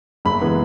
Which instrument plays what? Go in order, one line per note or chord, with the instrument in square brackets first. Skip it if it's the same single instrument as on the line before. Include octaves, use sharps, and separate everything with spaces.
[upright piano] F#1 B5
E3 G#3 B3